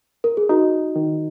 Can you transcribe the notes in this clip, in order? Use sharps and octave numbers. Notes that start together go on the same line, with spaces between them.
A#4
G#4
D#4 F#4
D#3